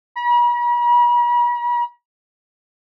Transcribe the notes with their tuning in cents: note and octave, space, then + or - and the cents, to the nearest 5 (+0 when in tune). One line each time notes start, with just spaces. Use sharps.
B5 -45